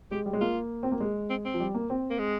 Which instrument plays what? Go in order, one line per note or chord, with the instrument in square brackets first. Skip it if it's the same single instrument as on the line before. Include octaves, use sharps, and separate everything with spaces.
[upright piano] G#3 [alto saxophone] G4
[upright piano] G3
G#3
[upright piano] A#3 [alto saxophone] F4
[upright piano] C4
A#3
G#3
[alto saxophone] C4
C4
[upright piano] F3
G3
A#3
C4
[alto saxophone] A#3
G#3